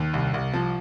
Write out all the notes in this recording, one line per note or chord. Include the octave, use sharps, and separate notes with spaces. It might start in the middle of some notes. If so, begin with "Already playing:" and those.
Already playing: D#2
C2
C2
F3